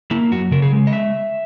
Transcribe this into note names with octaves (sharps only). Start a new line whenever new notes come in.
A#3 E4
F#2 F#4
C#3 A#4
G#4
G#3
D#5
E5